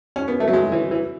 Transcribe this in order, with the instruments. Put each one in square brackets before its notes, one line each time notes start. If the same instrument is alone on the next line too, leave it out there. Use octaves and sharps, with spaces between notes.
[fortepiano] C#4
B3
A3
F#3
G#3
E3
E3